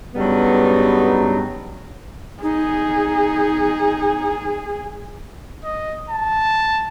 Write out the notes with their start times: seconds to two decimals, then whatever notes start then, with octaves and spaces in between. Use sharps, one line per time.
0.15 G2 C#3 F#3 G3 B3 D#4
2.43 D#4 G#4
5.64 D#5
6.10 A5